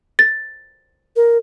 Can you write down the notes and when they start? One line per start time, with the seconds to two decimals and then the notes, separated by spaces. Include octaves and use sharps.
0.19 A6
1.16 A#4